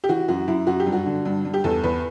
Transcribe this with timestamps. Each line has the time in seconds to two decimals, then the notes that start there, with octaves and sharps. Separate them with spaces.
0.04 G4
0.09 E3 F#4
0.28 F#2 F#4
0.48 F#2 E4
0.67 F#2 F#4
0.80 G4
0.87 G2
0.93 F#4
1.06 D3
1.25 G2
1.45 G2
1.54 G4
1.64 E2 A4
1.84 E2 B4